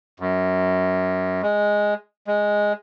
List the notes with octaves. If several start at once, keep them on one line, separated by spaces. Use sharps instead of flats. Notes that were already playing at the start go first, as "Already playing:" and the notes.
F#2
G#3
G#3